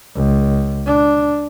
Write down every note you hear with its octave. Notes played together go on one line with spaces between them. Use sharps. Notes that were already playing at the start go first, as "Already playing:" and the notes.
C#2
D4